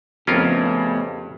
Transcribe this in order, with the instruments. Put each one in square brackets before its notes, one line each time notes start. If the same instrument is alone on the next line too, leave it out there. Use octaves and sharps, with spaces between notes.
[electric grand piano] F2 [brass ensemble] C#3 [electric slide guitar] A3 B3 G4 [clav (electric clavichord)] C#4 F4 A#4